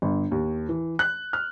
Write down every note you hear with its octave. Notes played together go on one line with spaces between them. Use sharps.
G1
D#2
E3
F#6
F6